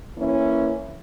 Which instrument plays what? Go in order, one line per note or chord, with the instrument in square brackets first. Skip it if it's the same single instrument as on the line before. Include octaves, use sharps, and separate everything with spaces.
[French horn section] E3 A#3 C#4 E4